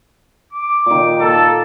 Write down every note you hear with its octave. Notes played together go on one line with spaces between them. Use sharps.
D6
A#2 D#3
A#3 A4 D6